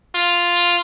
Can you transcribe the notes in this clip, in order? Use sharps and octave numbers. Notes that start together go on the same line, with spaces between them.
F4